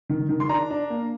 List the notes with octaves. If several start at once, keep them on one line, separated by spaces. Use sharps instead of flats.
D#3
D#3
C6
D4 A#5
D4
A#3